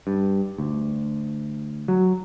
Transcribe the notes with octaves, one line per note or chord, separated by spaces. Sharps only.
G2
D2
F#3